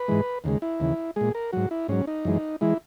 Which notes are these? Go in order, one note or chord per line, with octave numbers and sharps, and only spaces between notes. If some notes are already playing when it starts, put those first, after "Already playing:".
Already playing: B4
G#2 E3 G#3
D#2 C#3 G#3
E4
D#2 C#3 E3
A#2 G#3 G#4
A#4
G#2 F#3 F#4
E4
G#2 F#3 C#4
D#4
F#2 E3 G#3
E3 G#3 E4